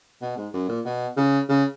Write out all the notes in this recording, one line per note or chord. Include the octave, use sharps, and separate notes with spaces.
B2
G#2
F#2
A#2
B2
C#3
C#3